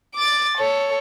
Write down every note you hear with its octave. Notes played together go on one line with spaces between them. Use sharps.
D6 A6
A4 C#5